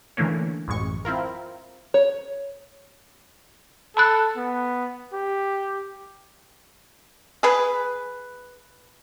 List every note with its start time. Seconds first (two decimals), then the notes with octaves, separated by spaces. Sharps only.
0.17 D3 E3 A3 A#3 C#4
0.68 A1 F#2 G#3 C#6
1.05 C4 E4 F4 A#4
1.94 C#5
3.97 A4 A5 B5 F#6
4.37 B3
5.13 G4
7.43 G#4 B4